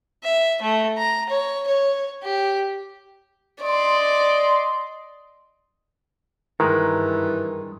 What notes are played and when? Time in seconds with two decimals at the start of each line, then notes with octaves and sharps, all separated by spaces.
0.24 E5
0.62 A3
0.98 A#5
1.29 C#5
1.67 C#5
2.23 G4
3.62 D5 D#5 C6
6.60 G2 D#3 E3 G#3 A#4